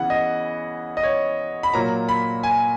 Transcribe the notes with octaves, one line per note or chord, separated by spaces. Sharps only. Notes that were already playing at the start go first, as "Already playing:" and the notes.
Already playing: C#3 E3 B3 F#5
D#5
D#5
C#5
B5
A#2 F#3 A#3 A#5
B5
G#5